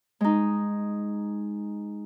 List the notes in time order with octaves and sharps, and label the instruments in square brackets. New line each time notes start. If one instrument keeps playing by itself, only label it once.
[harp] G#3 D#4